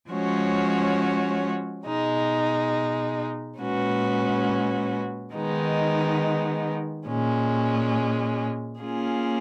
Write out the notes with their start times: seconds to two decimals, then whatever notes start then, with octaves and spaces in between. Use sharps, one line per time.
0.10 F3 G#3 C#4 F#4 C#5
1.85 B2 G#3 D#4
3.58 A#2 G#3 C#4 F#4 B4
5.33 D#3 G#3 B3 D#4
7.07 A#2 G#3 C#4
8.81 A#3 C#4 F4 G#4